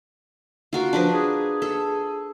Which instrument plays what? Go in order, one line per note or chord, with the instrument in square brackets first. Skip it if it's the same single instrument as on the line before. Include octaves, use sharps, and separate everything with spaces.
[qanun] F4 F#4 A#4
[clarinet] F3 [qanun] D4 A#4 B4
[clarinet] G#4
[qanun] A4